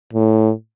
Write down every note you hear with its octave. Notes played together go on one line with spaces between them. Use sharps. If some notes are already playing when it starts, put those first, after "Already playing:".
A2